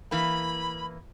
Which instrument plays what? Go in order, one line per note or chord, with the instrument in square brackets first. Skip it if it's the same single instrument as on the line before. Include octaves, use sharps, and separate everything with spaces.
[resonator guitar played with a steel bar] E3 A#3 [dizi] B5